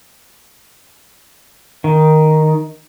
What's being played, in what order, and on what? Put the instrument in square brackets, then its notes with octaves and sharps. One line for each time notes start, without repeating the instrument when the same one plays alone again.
[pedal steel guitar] D#3